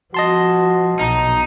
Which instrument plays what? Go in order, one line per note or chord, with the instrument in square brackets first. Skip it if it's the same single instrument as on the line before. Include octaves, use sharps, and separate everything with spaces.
[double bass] F3 [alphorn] F#4 [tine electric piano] D#5 A5 C6
[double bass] B1 [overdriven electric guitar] D#4